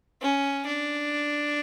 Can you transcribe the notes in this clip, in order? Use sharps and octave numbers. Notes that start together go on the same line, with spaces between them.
C#4
D4